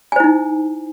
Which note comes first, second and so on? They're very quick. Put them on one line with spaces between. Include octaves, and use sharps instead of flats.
G#5 C5 E4 D#4